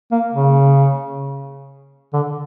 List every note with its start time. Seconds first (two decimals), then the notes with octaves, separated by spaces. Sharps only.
0.12 A#3
0.33 C#3
2.13 D3